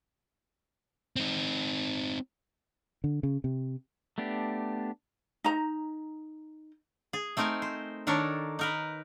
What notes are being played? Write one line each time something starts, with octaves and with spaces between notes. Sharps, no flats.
C4 D#4
D3
C#3
C3
A3 B3 D4 G4
D#4 A#5
G#4
A3 C4 D#4 A#4 G#5
C5
D#3 D4 A4 A#4 C#5
D#4 A#4 B4